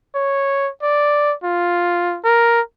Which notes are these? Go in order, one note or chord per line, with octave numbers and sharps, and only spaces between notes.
C#5
D5
F4
A#4